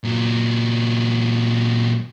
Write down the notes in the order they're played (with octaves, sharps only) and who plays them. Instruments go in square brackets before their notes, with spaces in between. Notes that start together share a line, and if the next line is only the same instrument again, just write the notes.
[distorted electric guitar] A#2 F#3